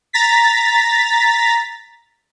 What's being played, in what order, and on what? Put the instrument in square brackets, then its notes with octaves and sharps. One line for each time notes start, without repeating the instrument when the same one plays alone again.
[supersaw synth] A#5 A6 B6